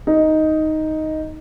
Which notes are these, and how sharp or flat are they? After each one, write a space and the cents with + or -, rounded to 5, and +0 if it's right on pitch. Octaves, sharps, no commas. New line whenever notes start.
D#4 +5